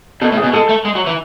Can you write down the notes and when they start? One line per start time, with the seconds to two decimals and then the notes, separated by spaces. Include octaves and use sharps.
0.21 B2 A4
0.32 A2
0.37 G#4
0.43 B2
0.53 G#3 A4
0.69 A3
0.85 G#3
0.95 F#3
1.07 E3